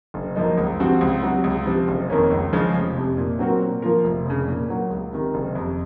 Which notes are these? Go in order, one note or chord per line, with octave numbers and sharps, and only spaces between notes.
F#1
F#2 F3 A#3 D#4
C#2
C3 F3 C4 F#4
C#2
C3 F#3
C#2
C3 F3
F#1
F2 D#3 A#3 C#4
C#2
C#3 F3 G#3
F1
F2 C3
A#2
F#3 C4 F#4 A#4
A#2
F3 A#3 F4 A#4
F1
F2 C#3
A#2
F#3 A#3
C#2
C3 D#3
F#1
F2 C3